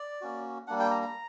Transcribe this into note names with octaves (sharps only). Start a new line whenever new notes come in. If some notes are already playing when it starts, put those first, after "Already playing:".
Already playing: D5
A#3 C#4 F#4
G3 A#3 D4 F#5
G5
A#5
A#5